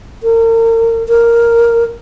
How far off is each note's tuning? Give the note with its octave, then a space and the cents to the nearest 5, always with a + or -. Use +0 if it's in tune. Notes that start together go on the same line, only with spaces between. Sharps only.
A#4 -35
A#4 +0